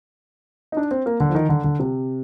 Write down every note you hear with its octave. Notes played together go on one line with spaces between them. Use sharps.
D#4
D4
C4
A#3
D3
F3
D#3
D3
D3
C3